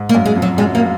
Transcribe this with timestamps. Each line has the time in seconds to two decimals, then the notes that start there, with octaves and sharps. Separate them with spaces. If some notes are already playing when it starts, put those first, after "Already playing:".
Already playing: G#2
0.09 A#3
0.15 F#2
0.26 G#3
0.36 F2
0.42 F#3
0.58 F#2 G#3
0.75 A#3